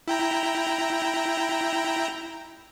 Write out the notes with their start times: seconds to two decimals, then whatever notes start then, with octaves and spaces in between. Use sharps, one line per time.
0.08 E4 G5 A#5